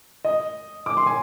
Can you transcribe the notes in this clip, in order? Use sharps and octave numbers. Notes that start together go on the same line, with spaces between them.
D#5
D6
C6
G#5